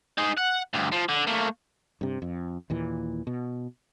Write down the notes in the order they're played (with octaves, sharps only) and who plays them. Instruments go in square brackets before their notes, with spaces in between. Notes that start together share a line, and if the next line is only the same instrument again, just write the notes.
[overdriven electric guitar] D#4 G#4
F#5
D2 G2
F3
D3
A3 A#3
[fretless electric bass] G2 C3
F2
D#2 A#2 E3
B2